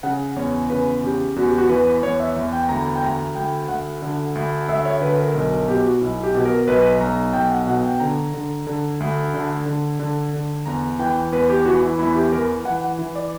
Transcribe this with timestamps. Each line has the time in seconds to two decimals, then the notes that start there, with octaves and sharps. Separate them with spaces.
0.03 C#3 F#5
0.36 E2 C#5
0.70 C#3 B4
1.03 C#3 G4
1.36 E2 F#4
1.47 G4
1.58 F#4
1.69 E3 B4
2.02 E2 C#5
2.20 E5
2.36 E2
2.53 G5
2.69 D2 A#5
2.95 G5
3.02 D2 A#5
3.35 D2 G5
3.68 D2 F#5
4.02 D3
4.35 D2
4.69 D2 E5
4.85 C#5
5.01 D3 B4
5.18 A#4
5.34 B1 A#4
5.51 A#4
5.69 B2 G4
5.84 F#4
6.01 B1 E4
6.23 G4
6.35 B2
6.46 A#4
6.68 B1 B4
7.01 B1 A#5
7.33 B1 G5
7.51 F#5
7.67 B2 F#5
7.84 G5
7.95 G5
8.00 D3 A#5
8.34 D3
8.67 D3
9.00 D2
9.34 D3
9.66 D3
10.00 D3
10.33 D3
10.66 E2 A#5
10.99 E3 G5
11.32 E2 B4
11.50 G4
11.66 E3 F#4
11.82 E4
11.99 E2 E4
12.15 G4
12.32 E3 A#4
12.65 E3 F#5
12.81 F#5
12.99 E3
13.15 D5